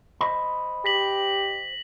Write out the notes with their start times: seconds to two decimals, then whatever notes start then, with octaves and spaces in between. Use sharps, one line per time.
0.21 C5 D#5 B5
0.85 G4 A#6 B6 F#7